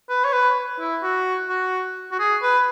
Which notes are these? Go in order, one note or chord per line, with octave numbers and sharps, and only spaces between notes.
B4
C#5
B4
E4
F#4
F#4
F#4
G#4
B4